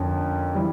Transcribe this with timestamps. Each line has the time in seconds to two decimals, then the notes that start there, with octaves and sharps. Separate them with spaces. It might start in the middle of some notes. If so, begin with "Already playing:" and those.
Already playing: F2 D3 A#3 C#4
0.55 E3 G3